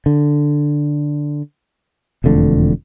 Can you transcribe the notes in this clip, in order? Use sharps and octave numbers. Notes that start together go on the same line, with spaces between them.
D3
E1 F2 D3 A3